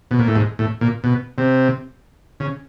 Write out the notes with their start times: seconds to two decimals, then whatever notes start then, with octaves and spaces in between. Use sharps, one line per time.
0.11 B2
0.19 A#2
0.28 A2
0.35 G#2
0.59 A2
0.81 A#2
1.04 B2
1.38 C3
2.40 C#3